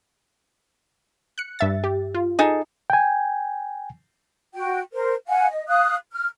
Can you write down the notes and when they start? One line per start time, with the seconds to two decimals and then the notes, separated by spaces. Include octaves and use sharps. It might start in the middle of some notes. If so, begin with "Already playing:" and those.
1.38 F#6 C#7
1.59 G2 E5 A6
1.84 G4
2.14 F4
2.39 D#4 G#4 A4
2.90 G5 G#5
4.54 F#4 G5
4.93 A#4 C5
5.28 F5 F#5 G#5
5.49 D#5
5.68 F5 D#6 F#6
6.12 F6